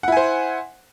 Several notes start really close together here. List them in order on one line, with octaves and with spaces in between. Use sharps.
F#5 E4 G#5 C5